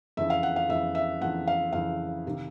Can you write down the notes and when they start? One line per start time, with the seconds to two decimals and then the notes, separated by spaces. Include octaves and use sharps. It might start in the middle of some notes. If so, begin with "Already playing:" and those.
0.17 F2 C#3 E3 E5
0.30 F5
0.43 F#5
0.56 F5
0.69 F2 C#3 E3 E5
0.95 E5
1.21 F2 C#3 E3 F#5
1.47 F5
1.73 F2 C#3 E3 F5
2.27 C3 D#3